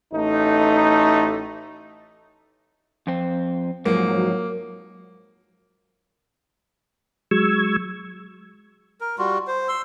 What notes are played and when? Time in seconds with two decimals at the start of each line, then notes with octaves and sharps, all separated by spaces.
0.13 A1 A3 D#4
3.07 F2 C4
3.85 G#2 F3 F#3 A#3
7.31 F#3 G#3 C#6 E6 G#6
9.01 A#4
9.18 G3 F4 F#4
9.47 C5
9.68 C6 E6